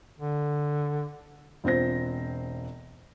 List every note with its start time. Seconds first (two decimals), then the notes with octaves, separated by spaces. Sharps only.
0.19 D3
1.64 E1 C4 F4 C5 A#6